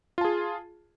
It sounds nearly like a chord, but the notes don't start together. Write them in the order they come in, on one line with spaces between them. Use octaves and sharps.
F4 A5 G#4